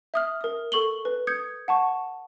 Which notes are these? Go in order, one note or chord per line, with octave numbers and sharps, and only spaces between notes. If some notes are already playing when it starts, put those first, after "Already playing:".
E5 D#6 F6
A#4 D#6
A4 C#6 F#7 G7
B4
D#6 G6 G#6 C#7
F#5 A5 C#6